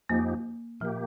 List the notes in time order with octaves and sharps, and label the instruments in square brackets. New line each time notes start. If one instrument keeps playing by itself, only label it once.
[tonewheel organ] F2 F3 D#4 G4 [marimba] A#3
[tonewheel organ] A#2 A#3 G4 [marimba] F3